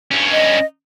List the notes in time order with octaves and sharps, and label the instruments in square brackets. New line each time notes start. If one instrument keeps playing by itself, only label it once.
[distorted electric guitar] G2 C#4
[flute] D#5